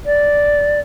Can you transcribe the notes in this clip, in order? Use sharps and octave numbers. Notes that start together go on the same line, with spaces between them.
D5